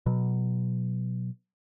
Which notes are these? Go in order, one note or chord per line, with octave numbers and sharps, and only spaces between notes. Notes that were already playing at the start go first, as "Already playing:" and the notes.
B2 F#3